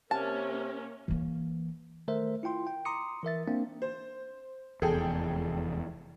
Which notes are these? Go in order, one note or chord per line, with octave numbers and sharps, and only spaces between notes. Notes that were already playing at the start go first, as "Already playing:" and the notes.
C3 A#3 C#4 A5
E3 A#3
D#3 A3 A#4 C5 E5
E4 F4 G5 C6
G5
A#5 C6 D6 D#6 C#7
E3 A#4 E5 A6
A#3 C4 D4
C5
F1 E2 G#4 A4 G5